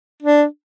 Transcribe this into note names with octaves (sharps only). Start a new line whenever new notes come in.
D4